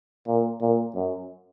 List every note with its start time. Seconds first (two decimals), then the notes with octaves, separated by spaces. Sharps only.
0.27 A#2
0.61 A#2
0.95 F#2